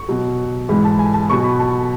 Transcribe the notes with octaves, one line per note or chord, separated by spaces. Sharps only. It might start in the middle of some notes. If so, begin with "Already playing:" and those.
Already playing: C#6
B2 F#3
G#2 E3 G#3 B5
A5
G#5
A5
B2 F#3 C#6
B5
A5